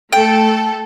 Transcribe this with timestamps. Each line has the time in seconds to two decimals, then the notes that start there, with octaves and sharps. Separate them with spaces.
0.13 A3 A4 G5